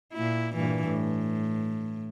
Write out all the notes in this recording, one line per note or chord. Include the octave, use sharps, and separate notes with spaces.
A#2 E4
G2 A#2 E3
A2